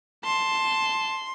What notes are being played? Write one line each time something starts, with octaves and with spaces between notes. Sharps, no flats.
A5 C6